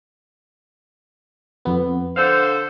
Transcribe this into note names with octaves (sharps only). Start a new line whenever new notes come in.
F2 B3
D3 A4 C5 F5 F#5